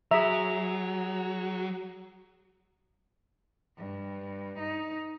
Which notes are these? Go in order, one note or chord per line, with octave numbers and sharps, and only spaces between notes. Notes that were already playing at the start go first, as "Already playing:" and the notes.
F#3 G#4 E5 A#5
G2
D#4